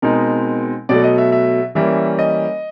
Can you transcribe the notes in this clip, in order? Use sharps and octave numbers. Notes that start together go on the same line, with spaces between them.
B2 G#3 C4 D#4 A#4
B2 F#3 A3 D5
D#5
E5
E5
E3 G3 A#3 C#4 E5
D#5